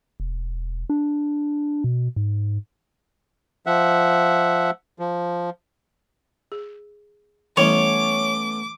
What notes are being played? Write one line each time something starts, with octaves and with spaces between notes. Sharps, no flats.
E1
D4
B2
G#2
F3 E5 F#5
F3
G#4
E3 G3 A3 B3 C#4 E4 C#5 D6